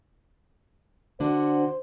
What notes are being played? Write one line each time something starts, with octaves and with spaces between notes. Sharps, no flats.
D3 D4 F#4 C5